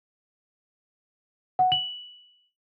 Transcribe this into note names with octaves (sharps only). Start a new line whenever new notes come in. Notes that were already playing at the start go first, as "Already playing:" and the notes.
F#5
F#7